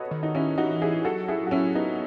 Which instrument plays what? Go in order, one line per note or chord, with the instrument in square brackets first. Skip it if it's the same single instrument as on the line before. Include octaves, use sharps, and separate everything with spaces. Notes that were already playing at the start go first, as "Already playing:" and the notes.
Already playing: [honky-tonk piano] F#4 A4 B4 C#5 D#5
[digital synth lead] D#3
[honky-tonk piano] D#4
C#4 E4
[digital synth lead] E3 [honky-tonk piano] D#4 F#4
[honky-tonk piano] E4 G#4
[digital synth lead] F#3 [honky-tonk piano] F#4 A4
[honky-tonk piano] E4 G#4
F#4
C#4 E4
B3 D#4